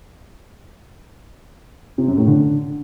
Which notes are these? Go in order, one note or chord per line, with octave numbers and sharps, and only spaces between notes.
C3
F#2
A2
D3